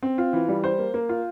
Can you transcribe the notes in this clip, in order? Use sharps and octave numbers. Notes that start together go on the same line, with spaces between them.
C4
F4
E3
G3
C5
A#3
A#3
F4